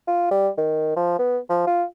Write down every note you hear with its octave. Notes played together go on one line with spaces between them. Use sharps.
F4
G3
D#3
F3
B3
F3
F4